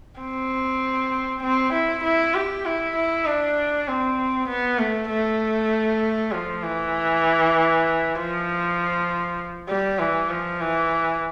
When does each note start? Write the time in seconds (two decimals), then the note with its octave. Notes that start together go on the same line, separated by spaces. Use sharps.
0.20 C4
1.43 C4
1.73 E4
2.03 E4
2.34 G4
2.65 E4
2.95 E4
3.26 D4
3.87 C4
4.48 B3
4.79 A3
5.09 A3
6.32 F3
6.62 E3
8.16 F3
9.68 G3
9.99 E3
10.29 F3
10.61 E3